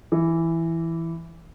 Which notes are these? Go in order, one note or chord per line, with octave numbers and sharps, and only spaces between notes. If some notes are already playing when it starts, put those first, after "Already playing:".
E3